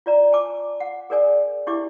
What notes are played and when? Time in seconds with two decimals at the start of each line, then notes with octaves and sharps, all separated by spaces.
0.06 F4 D5 A#5
0.33 G#5 A5 D6
0.80 F#5
1.10 G#4 A#4 D5 G#5
1.67 D4 E4 G4 E5 G#5 D6